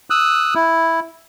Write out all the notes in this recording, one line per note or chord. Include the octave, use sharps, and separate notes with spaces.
D#6 E6 F#6
E4